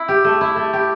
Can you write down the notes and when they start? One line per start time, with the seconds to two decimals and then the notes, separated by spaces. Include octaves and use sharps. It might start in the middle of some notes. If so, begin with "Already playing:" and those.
Already playing: E4
0.08 G4
0.24 A3
0.41 E4
0.56 A3
0.73 G4